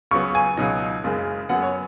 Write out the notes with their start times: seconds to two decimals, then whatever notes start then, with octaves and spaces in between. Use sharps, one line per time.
0.11 C#2 C#3 F#3 B3 C#6
0.35 G#5
0.57 C#2 B2 F#3 D#4
1.03 F#1 F#2 C#3 G#3
1.49 F#2 F#3 B3 F#5
1.63 C#5